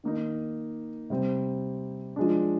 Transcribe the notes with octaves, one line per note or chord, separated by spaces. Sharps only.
D#3 A#3 D#4
C3 G3 C4
F3 G#3 D4